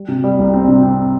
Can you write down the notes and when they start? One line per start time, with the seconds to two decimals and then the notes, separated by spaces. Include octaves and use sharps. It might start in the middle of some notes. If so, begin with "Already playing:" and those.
Already playing: G3
0.08 C3
0.24 G3
0.39 C2
0.54 C4
0.68 C3
0.83 C4